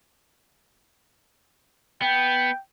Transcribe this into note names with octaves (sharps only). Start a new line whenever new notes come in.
B3 G5